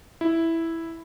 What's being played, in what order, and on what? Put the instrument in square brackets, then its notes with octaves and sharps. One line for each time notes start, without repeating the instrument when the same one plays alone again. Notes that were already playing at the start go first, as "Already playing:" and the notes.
[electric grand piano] E4